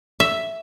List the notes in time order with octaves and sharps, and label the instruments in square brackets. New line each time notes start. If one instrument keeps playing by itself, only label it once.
[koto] E5